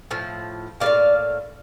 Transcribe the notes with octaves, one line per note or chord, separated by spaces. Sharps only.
A2 F3
G3 A#3 D5 F5
A2